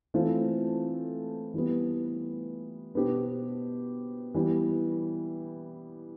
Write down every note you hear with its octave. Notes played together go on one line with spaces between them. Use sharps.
E3 A3 C4 F4 C5
E3 G3 B3
B2 B3 D4 G4 C5
E3 G3 B3